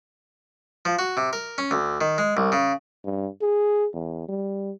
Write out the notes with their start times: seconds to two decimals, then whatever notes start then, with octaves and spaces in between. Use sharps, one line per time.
0.85 F3
0.99 F#4
1.17 C3
1.33 A#4
1.58 C#4
1.71 D2
2.01 D#3
2.18 G#3
2.37 C2
2.52 C#3
3.05 G2
3.41 G#4
3.93 E2
4.28 G3